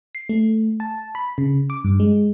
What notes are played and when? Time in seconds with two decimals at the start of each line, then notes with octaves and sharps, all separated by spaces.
0.15 C7
0.29 A3
0.80 A5
1.15 B5
1.38 C#3
1.70 D6
1.84 G2
2.00 G#3